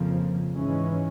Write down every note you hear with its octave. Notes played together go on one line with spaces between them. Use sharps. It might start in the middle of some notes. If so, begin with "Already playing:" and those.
Already playing: F2 C#3 F3 A#3
G#2 E3 G#3 C#4